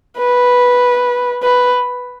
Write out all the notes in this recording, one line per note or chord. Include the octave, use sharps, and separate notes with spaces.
B4
B4